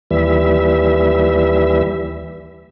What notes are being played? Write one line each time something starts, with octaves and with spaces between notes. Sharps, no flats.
D#2 E3 G3 E5